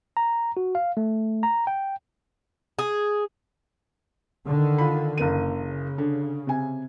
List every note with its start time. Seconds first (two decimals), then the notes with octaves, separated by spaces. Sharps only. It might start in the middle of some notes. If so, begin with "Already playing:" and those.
0.17 A#5
0.57 F#4
0.75 F5
0.97 A3
1.43 A#5
1.67 G5
2.79 G#4
4.47 D3 D#3
4.78 F4 B5
5.18 F#1 A#3 D#7
5.55 C#3
5.98 D3
6.47 C3 G#5